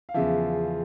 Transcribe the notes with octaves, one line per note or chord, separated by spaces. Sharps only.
F5
E2 C#3 F3 E5